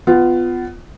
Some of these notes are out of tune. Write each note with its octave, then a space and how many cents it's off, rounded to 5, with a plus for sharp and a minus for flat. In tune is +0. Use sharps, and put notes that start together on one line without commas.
B3 +20 F4 +0